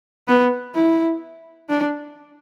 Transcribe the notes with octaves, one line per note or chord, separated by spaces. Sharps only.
B3
E4
D4